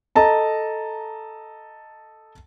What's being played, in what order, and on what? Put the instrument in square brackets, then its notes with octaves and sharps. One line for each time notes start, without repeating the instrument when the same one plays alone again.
[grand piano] A4 D#5 A5 A#5